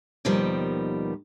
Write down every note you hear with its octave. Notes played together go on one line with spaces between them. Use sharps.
D#2 B2 D#3 F3 G3